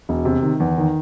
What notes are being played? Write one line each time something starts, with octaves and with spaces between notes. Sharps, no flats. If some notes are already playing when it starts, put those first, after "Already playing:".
E1
C3
D#3
E2
D#3